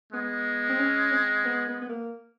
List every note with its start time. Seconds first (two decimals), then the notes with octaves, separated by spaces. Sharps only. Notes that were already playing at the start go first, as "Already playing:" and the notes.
0.12 G#3 B3
0.69 C4
0.79 C#4
1.12 C4
1.45 B3
1.68 B3
1.81 B3
1.89 A#3